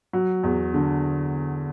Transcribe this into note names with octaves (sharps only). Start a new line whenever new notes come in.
F#3
E2
D3